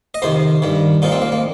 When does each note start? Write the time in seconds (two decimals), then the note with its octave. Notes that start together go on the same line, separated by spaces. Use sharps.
0.14 D#5
0.22 F2 C3 D#3 C5
0.62 G2 D#3
1.02 A#2 F3 D#4
1.12 C4
1.22 A#3
1.32 A#3